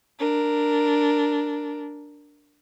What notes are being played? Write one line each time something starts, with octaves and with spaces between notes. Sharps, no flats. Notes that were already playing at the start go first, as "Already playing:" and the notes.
D4 A#4